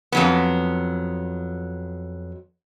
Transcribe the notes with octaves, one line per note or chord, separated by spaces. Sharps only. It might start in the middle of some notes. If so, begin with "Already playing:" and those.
F2 F#3 B3